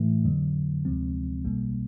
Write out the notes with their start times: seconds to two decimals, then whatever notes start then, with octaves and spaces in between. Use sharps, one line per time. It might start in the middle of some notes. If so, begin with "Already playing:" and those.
Already playing: A2 E3 A3
0.25 F2 D3 F#3
0.85 D2 C3 F3 G#3 C4
1.45 B1 B2 G3 A#3